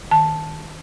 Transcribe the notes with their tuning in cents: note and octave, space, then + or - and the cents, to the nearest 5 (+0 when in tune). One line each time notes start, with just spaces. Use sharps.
D#3 +0 A5 +0